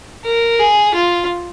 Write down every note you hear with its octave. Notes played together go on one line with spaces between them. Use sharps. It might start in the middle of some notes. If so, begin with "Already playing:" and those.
A#4
G#4
F4